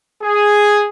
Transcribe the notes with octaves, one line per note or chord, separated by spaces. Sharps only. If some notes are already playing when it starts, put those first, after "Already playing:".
G#4